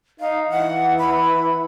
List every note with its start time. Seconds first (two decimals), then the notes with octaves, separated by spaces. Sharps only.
0.20 D#4 F5
0.50 E3 F#5
0.98 B5